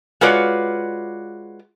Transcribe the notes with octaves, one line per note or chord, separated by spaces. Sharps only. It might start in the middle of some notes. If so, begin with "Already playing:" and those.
G#3 F4 F#4 B4 C#5 D5